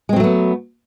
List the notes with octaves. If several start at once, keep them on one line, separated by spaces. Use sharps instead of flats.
F#3 G#3 A3 B3 C4